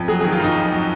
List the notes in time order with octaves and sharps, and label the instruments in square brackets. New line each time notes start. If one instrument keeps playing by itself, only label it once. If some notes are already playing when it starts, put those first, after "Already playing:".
Already playing: [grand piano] F2
F#3 G#4
G#4
D#3
F4
F#2 D#4
F2
F#3